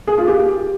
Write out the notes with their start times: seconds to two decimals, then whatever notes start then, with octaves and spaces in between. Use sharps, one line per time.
0.07 G#4
0.18 F4
0.28 G4